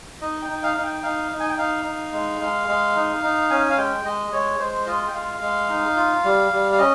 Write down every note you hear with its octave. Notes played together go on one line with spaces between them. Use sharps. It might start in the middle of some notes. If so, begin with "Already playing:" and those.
D#4 D#5
G5
D#4
F5
D#4 F5
G5
D#4 F5
D#4
G#5
G5
D#4 F5
D#4
G#3
G#3
G#3
D#4
D#4
C#4 G#5
F5
G#3 G5
G#3 D#5
G#3 C#5
G#3 C5
F4 D#5
G5
G#3 F5
G#3
D#4
F4
G3
G3
F5
C#4 D#5